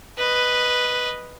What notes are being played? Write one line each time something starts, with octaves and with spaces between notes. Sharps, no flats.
B4 D#5